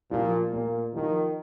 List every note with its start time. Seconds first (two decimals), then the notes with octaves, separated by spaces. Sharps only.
0.11 A#2 F3
0.52 A#2 A#3
0.94 D#3 F3